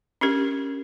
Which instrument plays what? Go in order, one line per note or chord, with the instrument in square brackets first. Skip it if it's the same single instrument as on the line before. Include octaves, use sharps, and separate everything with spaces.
[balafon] C#4 D4 G4 A#4